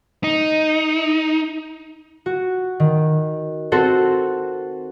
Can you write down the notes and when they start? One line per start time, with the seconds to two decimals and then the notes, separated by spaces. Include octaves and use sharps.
0.24 D#4
2.26 F#4
2.80 D#3
3.72 C4 F#4 A4 C5